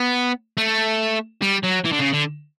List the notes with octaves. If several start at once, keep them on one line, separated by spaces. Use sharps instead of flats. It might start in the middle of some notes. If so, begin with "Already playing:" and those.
Already playing: B3
A3
G3
F#3
E3
D3
C#3
D3